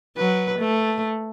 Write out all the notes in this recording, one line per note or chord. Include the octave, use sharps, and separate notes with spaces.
F#3 B4
A3